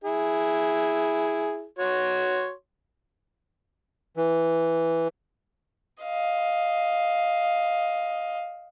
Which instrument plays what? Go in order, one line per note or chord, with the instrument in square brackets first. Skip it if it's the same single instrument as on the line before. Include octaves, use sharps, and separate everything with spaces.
[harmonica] E4 G#4
F#4 C#5 C6
[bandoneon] E3
[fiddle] D#5 F5